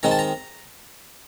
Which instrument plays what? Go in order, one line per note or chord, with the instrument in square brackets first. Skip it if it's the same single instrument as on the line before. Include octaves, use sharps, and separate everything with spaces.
[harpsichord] D#3 G#3 C4 D#4 A#5
A5
A#5